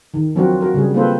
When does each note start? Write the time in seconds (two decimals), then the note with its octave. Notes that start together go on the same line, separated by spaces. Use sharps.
0.14 D#3
0.36 F3 F#3 C4 D4 F#4 A#4
0.61 F#4 A#4
0.74 C#3 G3 G#4
0.94 A#3 C4 F4 A4 B4 C5